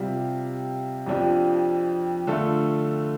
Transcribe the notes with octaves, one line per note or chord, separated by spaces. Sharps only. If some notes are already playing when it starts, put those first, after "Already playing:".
Already playing: C3 G3 F4
F2 F3 D4 G4
D3 A3 F4 A4